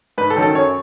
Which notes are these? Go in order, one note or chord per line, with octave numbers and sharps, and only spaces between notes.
G#2 B4
A4
D#3 F#3 C#4
A4
F#2 C#5